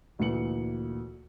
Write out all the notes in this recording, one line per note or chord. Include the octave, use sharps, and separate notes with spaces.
D2 A#2 E3 C#7 F#7